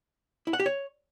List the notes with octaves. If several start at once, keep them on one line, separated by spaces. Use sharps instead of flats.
E4
F#5
G4
C#5